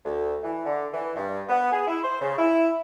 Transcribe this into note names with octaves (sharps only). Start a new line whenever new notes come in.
D2
E3
D3
E3
G2
B3
G#4
E4
C5
C#3
E4